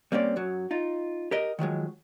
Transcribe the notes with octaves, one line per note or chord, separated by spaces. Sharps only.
G3 A#3 C4 C#4 D5
F#2 F#3
D#4 F4
G4 A#4 D#5
D#3 F3 F#3 G#3